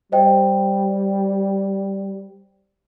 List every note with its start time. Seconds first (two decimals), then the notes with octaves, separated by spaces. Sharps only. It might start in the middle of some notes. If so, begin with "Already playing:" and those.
0.12 G3 C5 D#5 G5